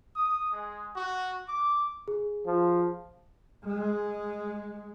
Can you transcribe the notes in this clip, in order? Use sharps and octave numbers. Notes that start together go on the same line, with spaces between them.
D#6
G#3
F#4
D6
G#4
F3
G#3